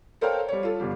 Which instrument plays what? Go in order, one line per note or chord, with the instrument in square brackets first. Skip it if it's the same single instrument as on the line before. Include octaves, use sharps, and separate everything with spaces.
[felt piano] A4 A#4 C5 C#5 F5 G5
G3 C#5
F4 A4
G1 G3